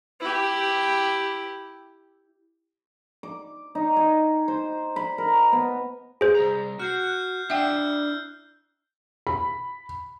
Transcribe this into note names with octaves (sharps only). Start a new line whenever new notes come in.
E4 G4
D6
D#4
G#5
C5
B5
A#4
B3
G#4 C5
C2 A#5
F#4 F6 G6 C7
F#6
D4 E4 E5 F#5 G5 E6 G6
B5